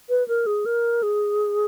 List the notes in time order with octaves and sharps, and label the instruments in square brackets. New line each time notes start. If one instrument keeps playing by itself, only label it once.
[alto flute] B4
A#4
G#4
A#4
G#4